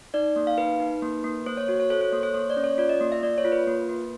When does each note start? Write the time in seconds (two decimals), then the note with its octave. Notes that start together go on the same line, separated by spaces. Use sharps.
0.14 D#4 D5
0.36 A#3
0.47 F5
0.58 D#4 B4
0.80 D#4
1.02 A#3
1.24 A#3
1.46 A#3 C5
1.57 C#5
1.68 F#4 C#5
1.80 C#5
1.90 A4 C5
2.01 C5
2.12 A#3 C#5
2.23 C5
2.34 A#3 C#5
2.50 D5
2.57 C#4
2.64 C#5
2.78 F4 D5
2.89 D#5
3.00 A#3
3.12 E5
3.23 A#3 D5
3.38 C#5
3.45 F4
3.52 B4
3.67 A#3
3.89 A#3